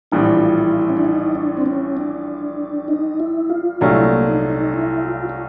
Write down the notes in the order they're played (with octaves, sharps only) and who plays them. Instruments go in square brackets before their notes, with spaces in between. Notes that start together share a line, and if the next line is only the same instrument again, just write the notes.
[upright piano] A#1 A2 E3 G3 [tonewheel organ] D4
[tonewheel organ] F4
E4
F4
E4
C#4
D4
D#4
D4
C4
C#4
D4
D#4
E4
F4
[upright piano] C2 A#2 F#3 A3 D4 [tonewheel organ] E4
[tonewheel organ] A#3
D#4
D#4
E4
F4
F4